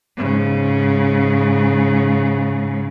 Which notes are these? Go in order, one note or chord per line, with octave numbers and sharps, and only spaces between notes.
G#2 C#3